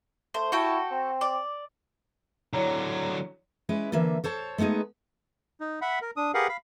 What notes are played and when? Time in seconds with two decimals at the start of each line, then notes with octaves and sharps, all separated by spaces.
0.34 A3 C5
0.52 E4 F#4 A4 G5
0.91 C4
1.21 D5
2.53 D3 F#3 E4 C#5 A#5
3.69 G#3 C#4 E4 B4
3.92 D3 E3 A#3 E5
4.24 A4 C5 C#5 A5
4.58 G#3 A3 B3 D#4 G#4
5.61 D#4
5.81 E5 F#5 B5
6.02 A#4
6.17 D4 D#6
6.34 G4 G#4 A#4 B4 F5 F#5
6.49 F5 B5